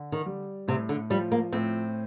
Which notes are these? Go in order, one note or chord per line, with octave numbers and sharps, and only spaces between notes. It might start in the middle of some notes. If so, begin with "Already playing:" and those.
Already playing: D3
D#3
G3
A2 C3
D3
F3 G3
A#3
A2 C4